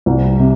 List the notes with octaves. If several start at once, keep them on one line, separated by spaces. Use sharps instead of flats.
C2
C3